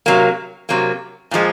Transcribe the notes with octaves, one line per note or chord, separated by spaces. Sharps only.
C3 F#3 A#3
C3 F#3 A#3
A#2 F3 G#3